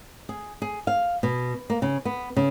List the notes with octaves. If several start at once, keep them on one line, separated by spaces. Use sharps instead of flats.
G#4
G#4
F5
B2
A#3
C#3
B3
C#3